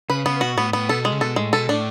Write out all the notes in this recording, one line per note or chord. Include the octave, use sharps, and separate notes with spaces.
C#3 B4
C#3 B3
B2 F#4
A2 B3
A2 B3
B2 A4
G#3
C#3
B2 A4
A2 G#3
B2 A4
A2 D4